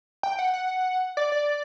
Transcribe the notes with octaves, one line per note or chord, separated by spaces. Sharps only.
G5
F#5
F#5
D5
D5